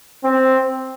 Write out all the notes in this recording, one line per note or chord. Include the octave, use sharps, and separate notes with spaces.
C4